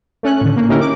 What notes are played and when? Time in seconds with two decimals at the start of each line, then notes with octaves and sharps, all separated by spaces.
0.23 A3 C#4 F#6
0.41 A2 D3
0.56 A#3
0.69 A#3 C#4 D#4 E4 G4 A#4
0.81 D6